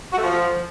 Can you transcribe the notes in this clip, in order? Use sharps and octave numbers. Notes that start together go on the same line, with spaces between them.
F#4
A3
F3